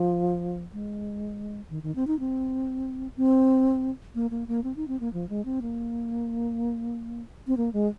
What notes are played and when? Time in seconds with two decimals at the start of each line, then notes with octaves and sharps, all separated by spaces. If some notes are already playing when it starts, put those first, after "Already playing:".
Already playing: F3
0.73 G#3
1.70 D#3
1.83 D#3
1.96 C4
2.07 D#4
2.19 C4
3.17 C4
4.15 A#3
4.31 A#3
4.48 A#3
4.64 C4
4.76 D#4
4.88 C4
5.00 A#3
5.13 F3
5.29 G#3
5.45 C4
5.62 A#3
7.47 C4
7.57 A#3
7.73 G#3